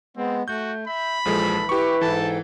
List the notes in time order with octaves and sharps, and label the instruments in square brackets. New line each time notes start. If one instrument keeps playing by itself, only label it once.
[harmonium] G#3 B3 [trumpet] C4
[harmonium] A3 [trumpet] F#4 [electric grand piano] G6
[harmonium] E5 [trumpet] B5
[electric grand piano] A#1 F3 G#3 [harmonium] E3 [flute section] A4
[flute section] E4 B4 [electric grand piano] G4 C#6
[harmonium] G#2 A4 G5 [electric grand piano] E3 [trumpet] A5